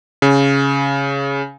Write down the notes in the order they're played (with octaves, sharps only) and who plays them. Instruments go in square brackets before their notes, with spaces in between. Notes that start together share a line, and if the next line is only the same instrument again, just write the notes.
[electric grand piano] C#3